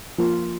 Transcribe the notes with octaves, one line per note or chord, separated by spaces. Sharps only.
F3 A#3 F4